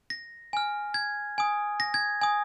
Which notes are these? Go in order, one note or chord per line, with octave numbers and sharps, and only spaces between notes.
A#6
G#5 F6
G#6
G#5 D#6
A#6
G#6
G#5 D#6